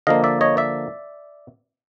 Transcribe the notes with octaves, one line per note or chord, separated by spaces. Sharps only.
D3 F3 A#3 D#5 F5
D5 E5
C#5 D#5
D5 E5